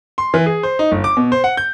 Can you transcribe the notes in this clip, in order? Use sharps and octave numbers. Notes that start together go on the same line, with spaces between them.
C6
E3
G#4
C5
D#4
G1
D6
B2
C5
F#5
G6